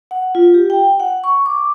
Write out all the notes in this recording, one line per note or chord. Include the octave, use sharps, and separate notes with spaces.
F#5
F4
G4
G5
F#5
C#6
D6